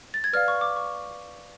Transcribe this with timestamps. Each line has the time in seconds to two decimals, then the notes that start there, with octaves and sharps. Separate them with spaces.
0.14 A6
0.24 G#6
0.33 B4 D5 F5 F6
0.48 C#6
0.61 D6
0.76 C#6